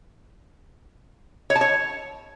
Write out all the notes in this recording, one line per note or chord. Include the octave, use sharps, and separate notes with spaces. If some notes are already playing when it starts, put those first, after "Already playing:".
C#5
A5
C#5